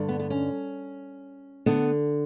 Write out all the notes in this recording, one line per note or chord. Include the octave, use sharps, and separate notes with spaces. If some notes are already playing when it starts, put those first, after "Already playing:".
Already playing: G2 D3
B3
B3
C#4
D3 B3